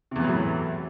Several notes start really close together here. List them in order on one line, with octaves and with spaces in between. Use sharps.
C3 E2 E3 F#3 A2